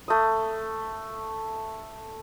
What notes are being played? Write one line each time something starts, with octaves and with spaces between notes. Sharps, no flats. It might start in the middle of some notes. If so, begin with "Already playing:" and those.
A3 D#6